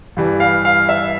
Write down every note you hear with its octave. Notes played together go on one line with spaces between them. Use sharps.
G2 E3 G3
F5
F5
E5